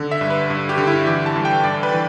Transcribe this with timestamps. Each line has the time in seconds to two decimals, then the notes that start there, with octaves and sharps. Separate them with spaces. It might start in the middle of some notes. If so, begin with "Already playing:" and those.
Already playing: D3
0.11 E5
0.21 G2
0.30 B4
0.50 G2
0.69 G4
0.78 D3
0.87 E4
1.06 E3 G4
1.26 A5
1.36 G2
1.45 G5
1.64 G2 D5
1.83 B4
1.92 E3